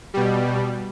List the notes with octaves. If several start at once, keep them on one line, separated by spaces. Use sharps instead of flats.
B2 G3